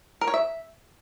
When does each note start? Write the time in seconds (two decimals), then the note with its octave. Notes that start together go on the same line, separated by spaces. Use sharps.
0.21 A#4
0.28 C#5
0.34 E5